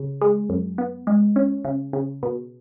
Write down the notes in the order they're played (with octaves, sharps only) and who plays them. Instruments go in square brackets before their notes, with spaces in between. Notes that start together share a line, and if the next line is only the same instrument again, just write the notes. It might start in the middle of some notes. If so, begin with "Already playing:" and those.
Already playing: [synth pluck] C#3
G#3
F#2
B3
G#3
C#4
C#3
C#3
B2